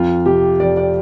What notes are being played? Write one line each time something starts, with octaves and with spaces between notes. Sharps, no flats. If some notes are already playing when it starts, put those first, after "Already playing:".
Already playing: F2 F4
C3 G4
F2 D5
D5